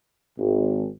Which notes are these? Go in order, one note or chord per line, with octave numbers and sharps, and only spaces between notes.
G#1